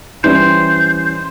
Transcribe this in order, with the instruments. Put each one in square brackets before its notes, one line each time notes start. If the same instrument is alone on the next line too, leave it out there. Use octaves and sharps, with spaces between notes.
[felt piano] E3 G3 C#4 [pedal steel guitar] C5